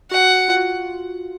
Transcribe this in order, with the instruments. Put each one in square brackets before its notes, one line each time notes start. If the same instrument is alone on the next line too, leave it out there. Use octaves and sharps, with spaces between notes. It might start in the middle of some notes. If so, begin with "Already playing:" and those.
[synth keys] F#4 [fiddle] F#5
[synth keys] F4
F#4